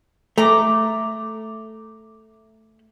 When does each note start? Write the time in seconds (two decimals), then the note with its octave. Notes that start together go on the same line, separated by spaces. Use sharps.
0.38 A3 A#5 D6